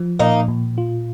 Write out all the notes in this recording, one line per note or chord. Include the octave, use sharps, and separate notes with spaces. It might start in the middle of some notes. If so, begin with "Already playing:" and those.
Already playing: F3
A#2 A#3 D#4
A#2
F4